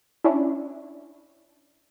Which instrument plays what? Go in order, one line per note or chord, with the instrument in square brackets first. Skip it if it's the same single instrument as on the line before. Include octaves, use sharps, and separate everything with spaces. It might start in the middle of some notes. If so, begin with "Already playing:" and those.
[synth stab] C#4 D4 E4